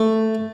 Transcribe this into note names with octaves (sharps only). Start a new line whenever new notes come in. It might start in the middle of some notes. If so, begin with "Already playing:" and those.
Already playing: A3